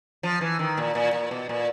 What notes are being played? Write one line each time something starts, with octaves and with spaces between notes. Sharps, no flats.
F3
E3
D#3
A#2
A#2
A#2
B2
A#2